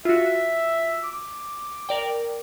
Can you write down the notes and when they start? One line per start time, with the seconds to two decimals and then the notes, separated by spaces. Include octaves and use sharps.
0.05 F4 F#4 E5
1.04 D6
1.89 A#4 D5 G5